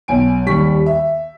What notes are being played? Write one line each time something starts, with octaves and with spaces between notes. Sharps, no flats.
B1 G#5 D7
D#2 G3 C#6 B6
E5